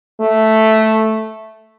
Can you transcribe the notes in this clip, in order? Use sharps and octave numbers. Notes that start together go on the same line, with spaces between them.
A3